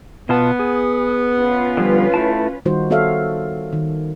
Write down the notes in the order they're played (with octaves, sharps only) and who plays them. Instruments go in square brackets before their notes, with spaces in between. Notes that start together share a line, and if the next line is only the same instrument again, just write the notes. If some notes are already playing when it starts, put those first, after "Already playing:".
[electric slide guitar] B2 F4 A5 [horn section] B3
[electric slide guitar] G#4
[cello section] C#4 F4 B4
[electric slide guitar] D3 F3 G3
A3 E4 A5
[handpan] D#3 G3 D#4 F4 F#4 C5
B3 F#4 A4 C#5 E5 F5
D#3